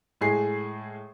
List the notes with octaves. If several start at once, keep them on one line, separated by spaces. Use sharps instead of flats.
A2 G#3 G#4 C7